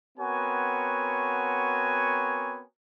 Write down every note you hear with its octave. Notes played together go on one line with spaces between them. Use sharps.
B3 C4 F#4 A#4 C#5 G#5